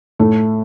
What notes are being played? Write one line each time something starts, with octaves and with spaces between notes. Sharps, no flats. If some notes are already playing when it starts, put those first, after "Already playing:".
A2 A3